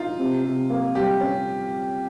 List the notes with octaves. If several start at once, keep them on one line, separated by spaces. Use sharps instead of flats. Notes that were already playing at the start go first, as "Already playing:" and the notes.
Already playing: D#4 F4
C3
C3
A#3
G3 G4
C#4